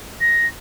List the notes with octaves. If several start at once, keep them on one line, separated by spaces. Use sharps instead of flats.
A#6